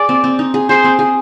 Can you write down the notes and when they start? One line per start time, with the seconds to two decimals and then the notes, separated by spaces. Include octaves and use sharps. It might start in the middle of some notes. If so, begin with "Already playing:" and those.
Already playing: G#4 D5
0.09 C4
0.24 C4
0.39 D#4
0.54 G#4
0.69 G#4 C5
0.84 C4
0.99 G#4